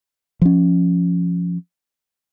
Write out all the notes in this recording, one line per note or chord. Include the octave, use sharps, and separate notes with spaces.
F3 C#4